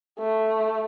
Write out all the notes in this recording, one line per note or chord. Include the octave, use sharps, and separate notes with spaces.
A3